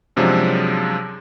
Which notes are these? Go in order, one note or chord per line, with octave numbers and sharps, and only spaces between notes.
F#2 C3 F3 F#3 G#3 D4